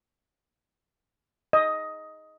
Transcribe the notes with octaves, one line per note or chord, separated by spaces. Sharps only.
D#5